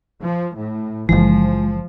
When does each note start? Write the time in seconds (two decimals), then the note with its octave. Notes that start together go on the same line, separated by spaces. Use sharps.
0.22 F3
0.56 A2
1.09 F#1 C#2 E3 F3 G#3